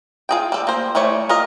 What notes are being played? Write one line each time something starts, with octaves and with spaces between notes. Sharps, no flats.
F4 G#4 G5
G3 A4
A#3 C5
E3 G3 A3 C#5
F4 A#4 D#5